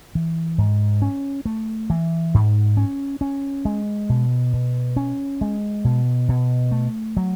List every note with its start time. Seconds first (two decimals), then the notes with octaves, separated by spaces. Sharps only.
0.15 E3
0.58 G#2
1.02 C#4
1.45 A3
1.90 E3
2.34 G#2
2.77 C#4
3.21 C#4
3.65 G#3
4.09 B2
4.53 B2
4.96 C#4
5.41 G#3
5.85 B2
6.29 B2
6.72 A3
7.17 F#3